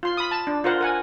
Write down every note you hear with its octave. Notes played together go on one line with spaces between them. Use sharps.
F4 C6
B5 D#6
A5
D4
F4 A#4 C5 F#5
A#4 F#5 G#5